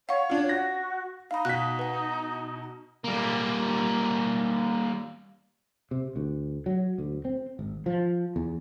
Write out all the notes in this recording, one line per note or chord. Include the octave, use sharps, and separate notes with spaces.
C#5 F5 F#5 C#6
D4 F4
F#4 A#6
D#4 F5 B5
B2 F#5 F#6 B6
B4 F#5
G3 A#3
C3
D2
F#3
D2
C4
G#1
F3
E2